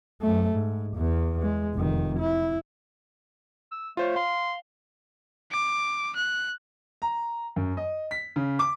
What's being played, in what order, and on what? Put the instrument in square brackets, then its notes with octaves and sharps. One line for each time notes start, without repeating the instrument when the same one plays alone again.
[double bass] F#2 A3
G#2
E2
G#3
F1 D#3
E4
[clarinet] E6
[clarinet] A3 [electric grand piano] F4 C5 C#5
[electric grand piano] F5 [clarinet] C6
[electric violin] D6
F#6
[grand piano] A#5
F#2
D#5
B6
C#3
D6